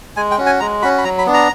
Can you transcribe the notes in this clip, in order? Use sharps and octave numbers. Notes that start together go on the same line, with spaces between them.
G#3 G#5
G5
C#4 F#4
G#5
G#3 A#5
C#4 F#4 B5
B5
F#3 A#5
B5
B3 D4
A#5